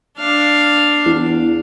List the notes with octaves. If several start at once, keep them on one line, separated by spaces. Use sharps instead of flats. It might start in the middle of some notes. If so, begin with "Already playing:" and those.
D4 F5
E2